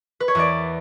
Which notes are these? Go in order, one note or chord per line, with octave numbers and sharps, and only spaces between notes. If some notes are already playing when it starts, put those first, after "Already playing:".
B4
C#5
E2 B4 D5